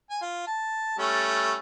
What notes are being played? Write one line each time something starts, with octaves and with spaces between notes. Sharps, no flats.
G#5
F4
A5
G3 A3 C#4